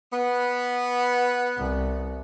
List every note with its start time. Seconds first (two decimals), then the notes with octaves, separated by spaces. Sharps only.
0.11 B3
1.57 C2